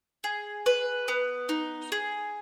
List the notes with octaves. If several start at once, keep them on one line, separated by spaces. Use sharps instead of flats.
G#4
B4
B3
D#4
G#4